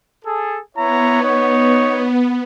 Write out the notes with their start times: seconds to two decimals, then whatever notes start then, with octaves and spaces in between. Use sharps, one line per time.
0.25 G#4 A4
0.76 B3 E4 C#5 A#5
1.23 D#4 C#5